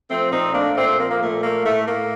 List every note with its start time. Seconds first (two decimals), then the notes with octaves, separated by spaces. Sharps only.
0.10 F3 A3 C4
0.31 A#2 C4 D#4
0.53 A3 A#3 D4
0.76 A#2 A3 C4
0.98 F3 A#3
1.11 A#3
1.21 A#2 A3
1.43 A3 A#3
1.65 A2 A3
1.87 A2 A#3